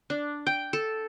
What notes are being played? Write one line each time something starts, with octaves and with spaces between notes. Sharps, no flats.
D4
G5
A4